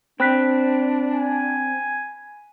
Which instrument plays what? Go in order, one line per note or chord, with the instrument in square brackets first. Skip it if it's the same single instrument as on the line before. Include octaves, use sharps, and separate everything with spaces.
[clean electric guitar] C4 [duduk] D4 [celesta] B5 F#6 B6
[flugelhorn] G#5